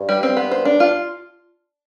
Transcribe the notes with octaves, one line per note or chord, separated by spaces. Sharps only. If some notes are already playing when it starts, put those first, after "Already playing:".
Already playing: G2
G3
C4
B3
C5
D4
F4